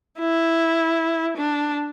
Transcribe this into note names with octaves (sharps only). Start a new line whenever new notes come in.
E4
D4